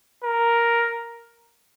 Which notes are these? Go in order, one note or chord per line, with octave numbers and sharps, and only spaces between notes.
A#4